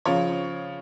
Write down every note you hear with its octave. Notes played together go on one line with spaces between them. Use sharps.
C#3 F3 C#5